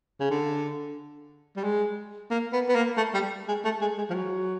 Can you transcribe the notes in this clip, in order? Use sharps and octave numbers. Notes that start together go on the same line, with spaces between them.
C#3
D3
G3
G#3
A#3
B3
B3
A#3
A3
G3
G#3
A3
G#3
G#3
F3
F#3